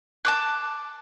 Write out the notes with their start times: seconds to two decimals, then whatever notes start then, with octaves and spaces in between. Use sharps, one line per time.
0.25 A5 D6 F#6